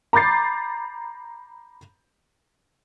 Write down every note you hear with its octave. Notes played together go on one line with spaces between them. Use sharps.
A#5 B5 D6 G6 A6 C7